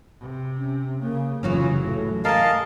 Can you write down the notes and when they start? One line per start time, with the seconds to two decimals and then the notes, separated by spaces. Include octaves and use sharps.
0.20 C3
0.58 C#4
1.01 C#3 A#3
1.43 F1 C#3 E3 F#3 C#4 F4
1.84 A2 A3
2.25 G#4 A#4 D#5 F5 A5